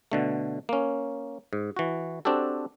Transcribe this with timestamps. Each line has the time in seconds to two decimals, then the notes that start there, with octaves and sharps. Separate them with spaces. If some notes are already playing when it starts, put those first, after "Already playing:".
0.12 B2 D3 A3
0.69 A#3 C#4
1.53 G#2
1.77 E3 F#4
2.25 C4 D4 F#4 G4 A4